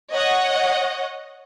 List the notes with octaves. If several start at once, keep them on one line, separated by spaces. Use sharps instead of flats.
C#5 D#5 F#5